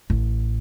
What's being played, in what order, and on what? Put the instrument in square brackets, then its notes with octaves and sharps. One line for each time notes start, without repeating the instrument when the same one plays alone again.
[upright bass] A1